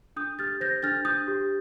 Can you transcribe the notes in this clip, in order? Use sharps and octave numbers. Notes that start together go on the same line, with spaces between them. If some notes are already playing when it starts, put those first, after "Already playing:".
D4 D#6 G6
G4 F6 A6
C5 G6 A#6
D4 F6 A6
D4 D#6 G6
G4